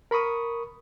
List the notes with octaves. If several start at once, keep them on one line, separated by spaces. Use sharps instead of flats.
A#4 B5 C#6 D#6